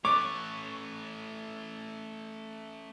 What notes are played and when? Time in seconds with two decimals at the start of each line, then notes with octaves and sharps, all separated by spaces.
0.05 A3 B4 C#5 D6